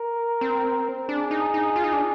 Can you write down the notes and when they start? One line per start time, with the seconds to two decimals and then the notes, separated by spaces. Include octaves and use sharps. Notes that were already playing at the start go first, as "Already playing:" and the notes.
Already playing: A#4
0.41 C4
1.08 D4 G#4
1.31 D#4
1.54 D#4
1.76 F4
1.84 D#4
1.93 D4